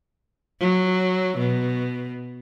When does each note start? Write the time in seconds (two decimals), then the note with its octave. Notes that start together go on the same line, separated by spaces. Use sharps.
0.60 F#3
1.38 B2